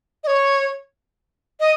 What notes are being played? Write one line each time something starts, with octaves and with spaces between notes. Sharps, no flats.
D#5
C#5
D#5